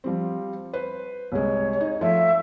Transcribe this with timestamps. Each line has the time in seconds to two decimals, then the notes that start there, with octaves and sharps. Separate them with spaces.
0.04 F3 G3 C4
0.73 B4 C5
1.32 C2 G#3 C#5
1.81 D#4
2.01 F3 A3 E5